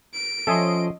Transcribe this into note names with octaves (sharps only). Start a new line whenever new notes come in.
D7
F3 C#4 A4 D#5 E5 G#5 C6